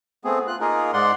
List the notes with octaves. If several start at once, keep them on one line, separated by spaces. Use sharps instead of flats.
A3 B3 C4 G#4
F4 F#6
A#3 D#4 F4 G#4 A#4
G#2 G#3 D5 F#5 C6